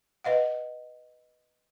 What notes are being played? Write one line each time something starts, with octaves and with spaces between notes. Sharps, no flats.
B4 D#5 F5 F#5